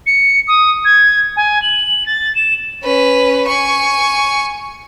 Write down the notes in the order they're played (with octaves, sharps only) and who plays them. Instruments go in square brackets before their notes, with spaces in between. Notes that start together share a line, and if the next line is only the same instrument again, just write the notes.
[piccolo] C#7
D#6
G#6
G#5
F#7
A6
E7
[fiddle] C#4 B4
G#5 C#6